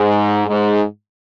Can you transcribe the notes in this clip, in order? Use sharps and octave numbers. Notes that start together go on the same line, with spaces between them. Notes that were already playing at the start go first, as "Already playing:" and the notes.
Already playing: G#2
G#2